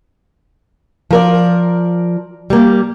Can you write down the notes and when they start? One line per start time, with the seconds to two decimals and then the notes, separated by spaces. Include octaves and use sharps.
1.11 F3 A#4 D5
2.50 G3 A#3